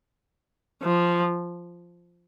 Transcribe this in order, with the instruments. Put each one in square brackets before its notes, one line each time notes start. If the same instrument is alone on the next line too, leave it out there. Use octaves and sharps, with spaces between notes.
[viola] F3